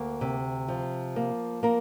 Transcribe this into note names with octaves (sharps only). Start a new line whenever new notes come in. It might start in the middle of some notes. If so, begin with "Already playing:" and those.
Already playing: D2 A#3
C3
F3
A#3
A#3 A#4